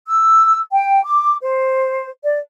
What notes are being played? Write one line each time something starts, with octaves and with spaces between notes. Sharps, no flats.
E6
G5
D6
C5
D5